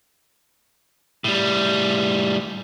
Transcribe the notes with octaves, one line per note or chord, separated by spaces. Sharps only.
A2 G3